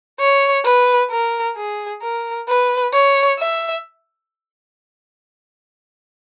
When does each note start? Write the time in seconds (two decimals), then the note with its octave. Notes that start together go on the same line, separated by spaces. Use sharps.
0.20 C#5
0.65 B4
1.11 A#4
1.56 G#4
2.02 A#4
2.48 B4
2.94 C#5
3.39 E5